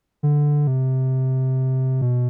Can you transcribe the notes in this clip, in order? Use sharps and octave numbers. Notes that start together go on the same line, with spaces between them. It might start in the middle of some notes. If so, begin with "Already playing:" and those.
D3
C3
B2